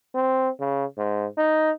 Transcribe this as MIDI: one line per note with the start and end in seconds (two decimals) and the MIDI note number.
0.15 0.49 60
0.60 0.85 49
0.98 1.26 44
1.37 1.71 63